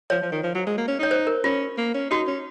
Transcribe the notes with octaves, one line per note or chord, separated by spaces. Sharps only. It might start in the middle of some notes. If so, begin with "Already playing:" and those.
F3 C#5
F3
D#3
F3
F#3
G#3
A#3
C#4
D#4 C#5
C5
A#4
C#4 F4
A#3
C#4
D#4 F#4
C#4